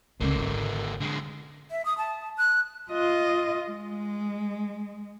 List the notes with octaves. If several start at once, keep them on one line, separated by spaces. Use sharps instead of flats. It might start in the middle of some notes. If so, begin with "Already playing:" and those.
C#2 D3 A#3 C#4
G#1 F4
D3 G#3
E5
D#6
A5
F#6
F4 D#5
G#3